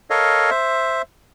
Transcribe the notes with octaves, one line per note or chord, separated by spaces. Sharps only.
A4 A#4 C#5 D#5 F5
C5 E5